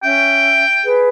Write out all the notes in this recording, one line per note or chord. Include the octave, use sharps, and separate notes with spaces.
C#4 E5 G5
G#4 B4